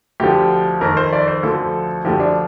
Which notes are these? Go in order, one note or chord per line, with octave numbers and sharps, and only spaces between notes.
D2 D3 F3 G4
F2 D#3 A#4
C5
D5
C5
D2 D3 F3 A4
D2 D3 F3 G4
D4